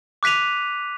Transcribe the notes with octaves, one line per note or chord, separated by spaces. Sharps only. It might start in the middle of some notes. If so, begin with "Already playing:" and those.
D6 F#6 B6 D#7 F7